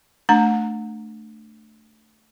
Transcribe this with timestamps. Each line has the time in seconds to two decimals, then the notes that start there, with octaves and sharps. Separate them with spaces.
0.29 A3 D4 A#5